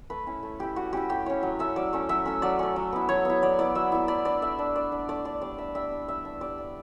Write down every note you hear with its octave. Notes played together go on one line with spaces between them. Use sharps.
A3 B4
C#4 E4
A3
C#4 E4 G4
A3 F#4
C#4 E4 G4
A3 G4
C#4 E4 C#5
F#3
A3 C#4 E5
F#3 D5
A3 C#4
F#3 E5
A3 C#4
F#3 D5
A3 C#4
F#3
B3 E4
F#3 C#5
B3 E4
F#3 D5
B3 E4 D5
F#3 E5
B3 E4
A3 D5
D4 D5
A3 E5
D4
A3 D5
D4
A3 D5
D4 D5
G3 D5
D4 E5
G3 E5
D4
G3 E5
D4
G3 D5
D4